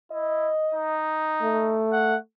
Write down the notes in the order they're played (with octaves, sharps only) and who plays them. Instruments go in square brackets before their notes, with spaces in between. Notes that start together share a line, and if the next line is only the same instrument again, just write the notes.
[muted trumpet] E4 [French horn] D#5
[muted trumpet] D#4
[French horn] A3
[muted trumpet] F#5